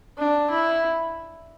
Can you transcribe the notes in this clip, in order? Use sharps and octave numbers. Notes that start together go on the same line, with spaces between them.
D4
E4